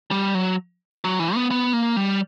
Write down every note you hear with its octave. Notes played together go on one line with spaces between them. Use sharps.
G3
F#3
F#3
E3
B3
B3
A#3
G3